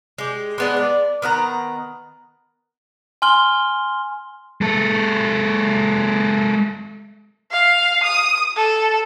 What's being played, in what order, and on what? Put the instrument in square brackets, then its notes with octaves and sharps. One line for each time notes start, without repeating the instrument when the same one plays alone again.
[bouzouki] G#3 G4
G#3 B3 D4
D5
D#3 B3 F#5 A#5
[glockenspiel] G#5 C6 F6 G7
[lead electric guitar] G#3 A4
[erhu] F5
D#6
A4